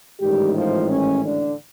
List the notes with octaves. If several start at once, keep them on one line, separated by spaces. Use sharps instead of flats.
A1 G#2 D#3 G3 G4
F3 F4
C#4
D3 D4